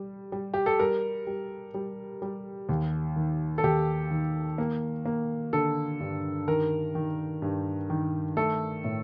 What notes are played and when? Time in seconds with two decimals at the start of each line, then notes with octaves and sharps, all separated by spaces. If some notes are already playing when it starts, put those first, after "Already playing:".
Already playing: G3
0.32 G3
0.54 G4
0.66 A4
0.79 G3 A#4
1.27 G3
1.74 G3
2.22 G3
2.69 D#2
3.16 D#3
3.58 A4
3.63 D#2 G4
4.11 D#3
4.58 A#3
5.05 A#3
5.53 D3 A4
6.00 G2
6.48 D#3 A#4
6.95 D#3
7.42 G2
7.90 D#3
8.37 A3 A4
8.84 A2